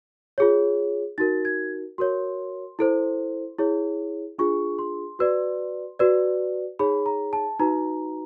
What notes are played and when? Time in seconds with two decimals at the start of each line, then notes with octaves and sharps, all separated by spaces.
0.38 F4 G#4 C#5
1.18 D#4 F#4 A#4 A6
1.45 G#6
1.98 F#4 A#4 C#5 C6
2.79 E4 A4 C5
3.59 E4 G#4 C#5
4.39 D4 F4 G#4 C#6
4.79 C6
5.19 F#4 B4 D5
5.99 F#4 B4 D5
6.79 D#4 G#4 C#5 B5
7.06 A#5
7.33 A5
7.59 D#4 F#4 B4 A#5